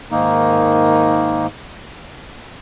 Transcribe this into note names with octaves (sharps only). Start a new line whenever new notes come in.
G#2 D#3 A#3 D#4